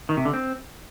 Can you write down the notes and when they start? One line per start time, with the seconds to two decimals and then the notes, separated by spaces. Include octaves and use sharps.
0.09 D#3
0.17 C3
0.25 D3
0.33 C4